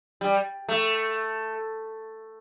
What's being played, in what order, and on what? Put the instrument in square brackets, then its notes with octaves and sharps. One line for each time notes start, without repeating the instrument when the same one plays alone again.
[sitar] G3
A3